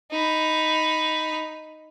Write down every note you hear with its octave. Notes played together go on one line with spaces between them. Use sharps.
D#4 B5